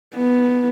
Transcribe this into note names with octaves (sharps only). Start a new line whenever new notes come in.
B3